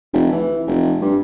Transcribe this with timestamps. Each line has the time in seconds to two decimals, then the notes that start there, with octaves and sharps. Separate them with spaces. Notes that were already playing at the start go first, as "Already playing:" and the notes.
0.13 F1
0.32 E3
0.67 F1
1.02 G2